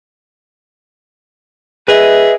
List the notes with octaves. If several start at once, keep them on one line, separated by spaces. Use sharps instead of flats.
G#4 B4 D#5 E5